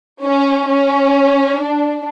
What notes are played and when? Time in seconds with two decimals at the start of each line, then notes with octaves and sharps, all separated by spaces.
0.23 C#4
0.69 C#4
1.59 D4